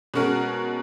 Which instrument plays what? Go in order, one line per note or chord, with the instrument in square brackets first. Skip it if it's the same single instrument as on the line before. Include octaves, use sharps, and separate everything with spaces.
[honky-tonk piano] B2 G#3 C#4 F#4 A#4